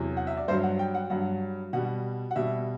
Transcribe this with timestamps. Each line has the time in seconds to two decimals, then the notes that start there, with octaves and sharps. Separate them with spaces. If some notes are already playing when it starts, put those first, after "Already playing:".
Already playing: E2 C3 F#3
0.17 F#5
0.27 E5
0.37 D5
0.48 G2 C5
0.52 F#3
0.63 F#5
0.79 G5
0.94 F#5
1.10 G2 F#3 F#5
1.73 B2 G3 F#5
2.31 F#5
2.35 B2 G3 E5